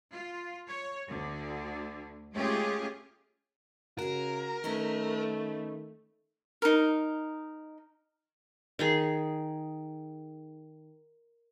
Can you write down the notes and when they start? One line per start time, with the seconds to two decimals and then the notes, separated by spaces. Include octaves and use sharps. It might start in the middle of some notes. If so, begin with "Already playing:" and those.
0.12 F4
0.68 C#5
1.08 D2 D3
2.33 G#3 A3 C#4 F4 G4 G#4
3.99 C#3 F#4 G#4 A#4
4.64 D#3 A3 C#4 D#4 B4
6.62 D#4 A#4
8.79 D#3 D#4 G#4